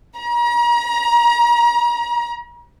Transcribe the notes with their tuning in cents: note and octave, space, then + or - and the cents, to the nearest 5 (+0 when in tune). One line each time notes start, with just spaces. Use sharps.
A#5 +40